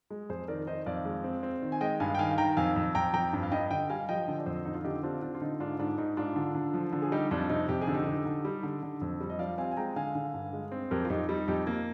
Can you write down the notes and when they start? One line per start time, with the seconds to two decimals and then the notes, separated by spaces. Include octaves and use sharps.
0.10 G#3
0.29 F2 G#4 C5
0.48 D#3 A#4 D5
0.67 D#3 C5 D#5
0.86 F2 D5 F5
1.05 G#3
1.24 C4
1.43 C4
1.62 D#3
1.72 G#5
1.81 G#3 D#5 G5
2.00 G2 F5 G#5
2.15 G5
2.19 D#3 F5 G#5
2.38 D#3 G5 A#5
2.57 F2 F5 G#5
2.76 F2
2.95 F2 G5 A#5
3.13 F2 G5 A#5
3.33 G2
3.43 F5
3.52 G2 D#5 G5
3.71 D3 D#5 G5
3.90 G3 F5 G#5
4.09 F3 D#5 G5
4.28 D3
4.39 D5
4.46 F2 C5 D#5
4.65 D3 D#4
4.74 F4
4.84 D3 D#4 G4
5.03 C4 D4 F4
5.22 D3 D4
5.35 F4
5.41 D3 D#4
5.60 G#2 D4 F4
5.79 G#2 D4
5.98 G#2 D#4
6.17 G#2 D4 F4
6.36 D3
6.55 D3
6.74 F3
6.93 D3
7.02 G#4
7.12 G3 D#4 G4
7.31 F2 D4 F4
7.49 C3 D#4
7.68 F2 G4
7.81 G#4
7.87 D3
7.94 D#4 G4
8.06 D3
8.25 D3
8.45 G3
8.63 D3
8.82 D3
9.01 F2
9.20 G3
9.30 D#5
9.39 F3 D5 F5
9.58 C4 F5 G#5
9.71 G#5
9.77 G#3 G5 A#5
9.96 D3 F5 G#5
10.15 D3
10.34 G2
10.53 G#3
10.72 C4
10.91 F2 G4 A#4
11.05 F4
11.10 F2 D#4 G4
11.29 G3 D#4
11.48 F2 D#4 G4
11.67 A#3